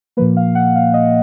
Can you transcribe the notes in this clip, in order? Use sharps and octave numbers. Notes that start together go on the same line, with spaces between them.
A#2 F3 A#3 B4
F5
F#5
F5
D#5